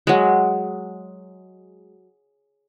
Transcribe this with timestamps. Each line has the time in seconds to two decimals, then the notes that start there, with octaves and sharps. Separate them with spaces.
0.07 F#3 G#3